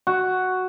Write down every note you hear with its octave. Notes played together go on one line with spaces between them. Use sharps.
F#4